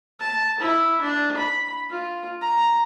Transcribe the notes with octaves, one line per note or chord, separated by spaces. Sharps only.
A5
E4
D4
B5
F4
A#5